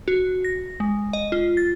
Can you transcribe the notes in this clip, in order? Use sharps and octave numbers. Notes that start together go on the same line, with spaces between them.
F#4
A#6
G#3
D#5
F4
A6